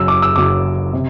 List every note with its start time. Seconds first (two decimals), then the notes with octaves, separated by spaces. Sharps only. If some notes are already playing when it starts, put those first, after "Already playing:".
Already playing: F#1 F#2 F#3 E6
0.08 D6
0.22 E6
0.36 F#1 F#2 F#3 D6
0.93 C3